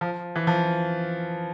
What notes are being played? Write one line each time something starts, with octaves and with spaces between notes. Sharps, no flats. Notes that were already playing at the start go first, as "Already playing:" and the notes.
F3
E3
F3